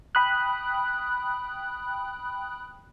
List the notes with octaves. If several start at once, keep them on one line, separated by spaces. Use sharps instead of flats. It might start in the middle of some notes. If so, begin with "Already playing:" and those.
G5 B5 D#6 F#6